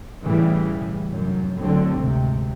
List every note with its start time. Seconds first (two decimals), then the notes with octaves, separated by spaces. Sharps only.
0.23 A2 C#3 E3 G3
1.11 F1 F#2
1.59 A1 D3 F#3 A3 C4
1.97 G#1 D2 C3